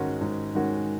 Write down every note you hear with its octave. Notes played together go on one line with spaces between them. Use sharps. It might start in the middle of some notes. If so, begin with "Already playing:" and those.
Already playing: G#2 D#3 G#3 C#4 F#4
G#2
D#3 G#3 C#4 F#4